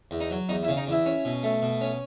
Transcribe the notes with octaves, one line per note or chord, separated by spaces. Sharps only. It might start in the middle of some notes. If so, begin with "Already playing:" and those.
E2
D#4
F#3
E2 D#4
E4
C#3
D#4
E2 E4
C#4
B2
A3
B2
C#4